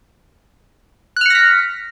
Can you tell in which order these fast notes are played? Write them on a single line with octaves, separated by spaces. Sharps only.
F#6 F6 C#7 A#6 B6